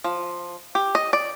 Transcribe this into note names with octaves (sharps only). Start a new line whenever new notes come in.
F3
G4
D#5
D5